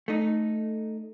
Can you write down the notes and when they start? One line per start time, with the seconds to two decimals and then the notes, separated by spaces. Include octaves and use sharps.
0.08 A3 D#4